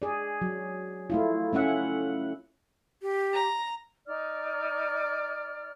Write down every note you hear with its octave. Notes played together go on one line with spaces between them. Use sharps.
G#4 D5
F#3
A3 E4 F4
A3 C#4 E5 F#5
G4
A#5
D#4 D5 F6